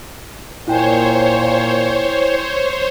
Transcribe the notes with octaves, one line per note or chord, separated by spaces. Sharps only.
A#2 E4 C5 C#5 G5 G#5